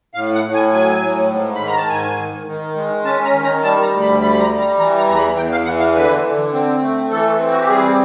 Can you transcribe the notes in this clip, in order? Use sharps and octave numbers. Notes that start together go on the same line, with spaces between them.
A2 F5
F#5
A2
G#5
F#3 G#5
A2
G#2
D#3 B5
A#5
A5
G#2 G#5
D#3
D#3
G#3
C#4 A5
A#5
D#3
A#5
G3 A5
A#5
D2
B5
G3 B5
B5
A#5
G3
A#5
E3 A#5
A#5
E2 A#5
B5
E2 G5
F5
E3 F#5
F5
D3 B4
D3
C4
A3
E3 A4
C4
F#4
G4
G3 G#4